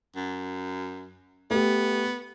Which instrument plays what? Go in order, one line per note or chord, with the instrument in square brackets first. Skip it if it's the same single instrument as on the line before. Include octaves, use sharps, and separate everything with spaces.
[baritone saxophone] F#2
[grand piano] A3 G4 [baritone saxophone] B3